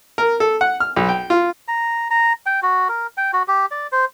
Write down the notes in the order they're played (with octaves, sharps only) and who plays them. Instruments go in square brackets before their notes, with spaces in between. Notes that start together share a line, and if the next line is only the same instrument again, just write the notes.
[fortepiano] A#4
A4
F#5
F6
B1
G5
F4
[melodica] A#5
A#5
G5
F#4
A#4
G5
F#4
G4
D5
C5